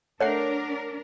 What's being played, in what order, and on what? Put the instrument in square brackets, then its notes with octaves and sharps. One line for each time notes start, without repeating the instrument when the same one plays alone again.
[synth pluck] A3 F#5 C7 [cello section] D4 A#4 [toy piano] C#5